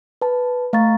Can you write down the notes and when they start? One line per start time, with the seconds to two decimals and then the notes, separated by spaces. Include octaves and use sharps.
0.22 B4 A5
0.73 A3 F5 A#5 C#6 A6